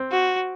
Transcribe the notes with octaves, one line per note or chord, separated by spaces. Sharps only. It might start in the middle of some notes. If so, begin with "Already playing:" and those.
Already playing: C4
F#4